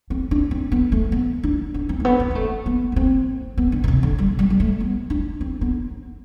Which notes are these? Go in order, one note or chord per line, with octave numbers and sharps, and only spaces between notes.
C4
D4
C4
B3
A3
B3
D4
D4
C4
A3
B3
B3
B3
A3
B3
B3
C4
B3
D3
B2
C3
D3
G3
G3
G3
A3
B3
D4
C4
B3